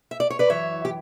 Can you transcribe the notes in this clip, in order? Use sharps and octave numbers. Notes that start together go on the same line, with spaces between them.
E5
D5
C#5
B4 D5
F#2 E3 C#5 E5
G4